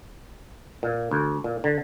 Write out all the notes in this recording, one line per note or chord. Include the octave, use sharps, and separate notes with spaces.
A#2
D2
A#2
D3